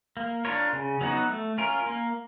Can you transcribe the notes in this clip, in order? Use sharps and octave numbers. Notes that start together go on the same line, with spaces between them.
A#3
D4 F4 A#4 C#5
C#3
F#3 B3 D#4 F#4
A3
C#4 F4 A#4
A#3